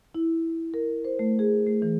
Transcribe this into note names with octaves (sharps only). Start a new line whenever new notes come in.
E4
A#4
C5
A3
G#4
A3
E3